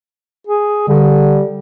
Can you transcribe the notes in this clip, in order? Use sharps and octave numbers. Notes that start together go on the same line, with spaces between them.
G#4
D3 G3